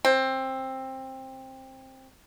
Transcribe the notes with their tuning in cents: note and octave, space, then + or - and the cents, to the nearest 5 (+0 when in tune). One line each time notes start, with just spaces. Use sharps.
C4 +15